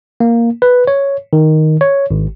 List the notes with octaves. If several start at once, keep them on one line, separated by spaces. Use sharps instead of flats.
A#3
B4
C#5
D#3
C#5
G#1